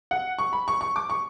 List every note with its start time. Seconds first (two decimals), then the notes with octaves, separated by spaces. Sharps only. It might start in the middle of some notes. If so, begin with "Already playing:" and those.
0.11 F#5
0.39 C#6
0.53 B5
0.68 C#6
0.81 C#6
0.96 D6
1.10 C#6